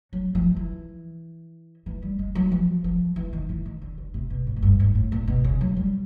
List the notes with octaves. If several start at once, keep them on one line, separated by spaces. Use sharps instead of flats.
F#3
F3
E3
E3
G3
G#3
F#3
F3
F3
E3
D#3
E3
D#3
D3
D3
C3
B2
A2
G#2
G2
G#2
A2
A#2
B2
C#3
F#3
G3